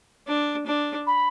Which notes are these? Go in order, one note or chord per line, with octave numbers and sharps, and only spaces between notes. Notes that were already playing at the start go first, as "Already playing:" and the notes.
D4
D4
B5